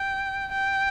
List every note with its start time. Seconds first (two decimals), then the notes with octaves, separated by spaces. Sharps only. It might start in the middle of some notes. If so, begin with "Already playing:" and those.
Already playing: G5
0.52 G5